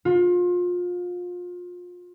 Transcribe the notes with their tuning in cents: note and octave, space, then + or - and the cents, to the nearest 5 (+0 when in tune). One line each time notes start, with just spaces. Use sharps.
F4 +30